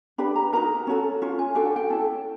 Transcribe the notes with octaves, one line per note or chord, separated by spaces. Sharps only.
D4 G4 B4 B5
A#5
D#4 F#4 A#4 A#5
C#4 F#4 A4
C#4 F4
G#5
D4 F#4 A4 G5
F#5
G5
C#4 E4 A4